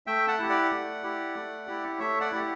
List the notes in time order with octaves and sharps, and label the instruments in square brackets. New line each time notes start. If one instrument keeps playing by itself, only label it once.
[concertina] A3 E5 G5
F#5 A5
E4 G4
D5 F#5
A3
E4 G4
A3
E4 G4
A3 C#5 E5
D5 F#5
E4 G4